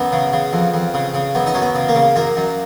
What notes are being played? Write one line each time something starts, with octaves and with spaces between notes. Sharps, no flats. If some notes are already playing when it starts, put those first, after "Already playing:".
Already playing: F#2 B3
C#3
C#3
F2
F2
C#3
C#3
F#2 B3
D#4
F#2 C#4
B3
C#3
A#3
C#3
F#2 A#3
F#2